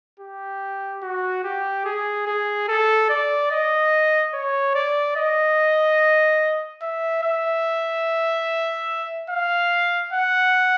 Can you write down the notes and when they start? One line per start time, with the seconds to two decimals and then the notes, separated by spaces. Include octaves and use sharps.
0.20 G4
1.03 F#4
1.44 G4
1.85 G#4
2.27 G#4
2.68 A4
3.10 D5
3.51 D#5
4.34 C#5
4.75 D5
5.17 D#5
6.82 E5
7.23 E5
9.30 F5
10.13 F#5